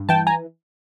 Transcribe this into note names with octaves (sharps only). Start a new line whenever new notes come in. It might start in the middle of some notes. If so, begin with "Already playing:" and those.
Already playing: G2
E3 G5 A5
G#5 A#5